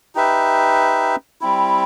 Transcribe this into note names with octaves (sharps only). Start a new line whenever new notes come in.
D#4 G4 B4 E5
G3 C4 E4